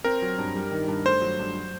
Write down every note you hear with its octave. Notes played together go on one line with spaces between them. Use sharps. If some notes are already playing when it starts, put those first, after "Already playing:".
C4 A#4
F#3
G2
G3
D#3
G2
A3 C5
F#3
G2
F#3